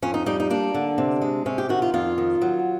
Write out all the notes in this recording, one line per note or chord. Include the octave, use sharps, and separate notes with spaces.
F2 C#4
D#4
G3 D#4
D#4
A#3 D4
D3
C3
G#3
C3 C#4
G4
D#3 F#4
F4
F2 F4
D#3
F#3